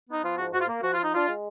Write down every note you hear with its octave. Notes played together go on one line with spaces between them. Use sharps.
B3 D#4
F3 F4
G#2 F#4
G#2 F#4
F4
A#3
F3 F#4
F3 F4
D#4
D4 F4
G#3